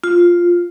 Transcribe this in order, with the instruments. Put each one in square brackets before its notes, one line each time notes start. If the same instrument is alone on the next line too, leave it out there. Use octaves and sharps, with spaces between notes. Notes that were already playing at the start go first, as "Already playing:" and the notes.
[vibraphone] F4